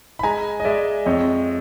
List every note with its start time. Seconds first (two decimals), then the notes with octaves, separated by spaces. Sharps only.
0.19 B5
0.23 G#3 G#5 A#5
0.60 D#5
0.65 G#3 D5 E5
1.06 F2 C#5 D#5